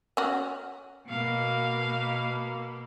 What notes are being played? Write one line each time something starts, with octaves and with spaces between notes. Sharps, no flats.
C#4 F#4
B2 A#3 F5